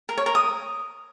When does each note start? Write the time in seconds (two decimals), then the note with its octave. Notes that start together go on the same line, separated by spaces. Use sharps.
0.09 A#4
0.17 C#5
0.26 A#4
0.35 D#6